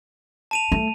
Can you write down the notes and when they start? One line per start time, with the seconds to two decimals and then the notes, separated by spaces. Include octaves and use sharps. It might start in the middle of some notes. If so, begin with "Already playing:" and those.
0.51 A5 D#7 F7
0.72 A3